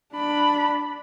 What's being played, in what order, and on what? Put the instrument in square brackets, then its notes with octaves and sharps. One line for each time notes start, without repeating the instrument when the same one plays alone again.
[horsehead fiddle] D4 B5